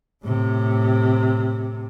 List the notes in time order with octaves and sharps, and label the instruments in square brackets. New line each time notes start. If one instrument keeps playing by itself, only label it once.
[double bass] A2 C3